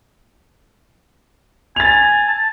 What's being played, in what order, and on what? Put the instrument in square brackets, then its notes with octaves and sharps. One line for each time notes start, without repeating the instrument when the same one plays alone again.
[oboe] G#5 [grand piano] A6 F7
[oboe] A5